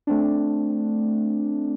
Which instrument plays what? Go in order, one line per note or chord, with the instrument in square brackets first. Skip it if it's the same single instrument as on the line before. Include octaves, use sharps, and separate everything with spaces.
[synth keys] A3 C4 D4